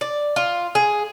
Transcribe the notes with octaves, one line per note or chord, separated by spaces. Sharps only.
D5
F4
G#4